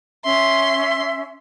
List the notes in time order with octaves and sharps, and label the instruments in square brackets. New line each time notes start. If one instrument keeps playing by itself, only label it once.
[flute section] C#4 E5 [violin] C6